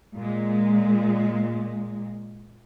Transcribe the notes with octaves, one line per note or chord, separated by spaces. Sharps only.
A#2 G#3